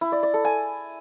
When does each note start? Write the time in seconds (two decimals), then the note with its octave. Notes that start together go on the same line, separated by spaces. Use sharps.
0.01 E4
0.12 D5
0.23 D5
0.34 A4
0.45 G#5